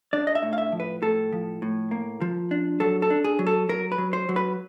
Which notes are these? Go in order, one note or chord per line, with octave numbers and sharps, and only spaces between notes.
D4 D5
D#5
E5
A2
F5
E5
F3
B4
A2 A4
F3
A2
A#3
F3
D4
F#3 A4
A4
D4
G#4
F#3
A4
F#3 A#4
B4
F#3
C5
F#3
B4